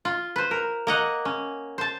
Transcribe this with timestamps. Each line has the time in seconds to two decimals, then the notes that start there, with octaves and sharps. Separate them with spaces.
0.05 F4
0.36 B4 C5
0.51 A#4
0.87 A#3 D#5 F#5
1.25 C#4
1.78 C5 A5